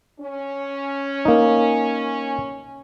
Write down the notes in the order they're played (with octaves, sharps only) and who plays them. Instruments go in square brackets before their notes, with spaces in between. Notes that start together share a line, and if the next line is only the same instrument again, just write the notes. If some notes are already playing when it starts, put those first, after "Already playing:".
[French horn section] C#4
[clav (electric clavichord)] A#3 D#4